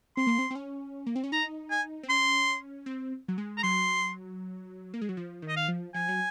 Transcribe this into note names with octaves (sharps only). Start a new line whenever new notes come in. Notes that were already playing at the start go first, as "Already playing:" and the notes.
C4 C6
A#3
C4
C4
C#4
A#3
C4
C#4
D#4 A#5
G#5
C4
C#4 C6
C4
F#3
G#3
A#5
F#3 C6
A#3
G#3
F#3
F3
D#3
D#5
F5
F3
F3 G#5
F#3